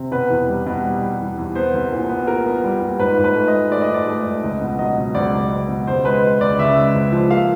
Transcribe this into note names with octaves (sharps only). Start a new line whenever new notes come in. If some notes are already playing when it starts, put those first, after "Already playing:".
Already playing: C3
B2 B4
E2
G3
B2
G3
G3
E2
E2
B3 C5
C2
A#2
B3
A#2 A#4
B3
G3
A#2
G#2 B4
G#2
B4
A3
D#5
A3
A3 D5
D#5
G#2 D5
A3
G#2
C#2 D#5
B2
F#3 D#5
B2
C#2 D5
C#2
C#2
B2
C#2 C5
G#3 B4
G#3
C#2 D5
C#3 E5
G#3
C#2
F3
A#3 F5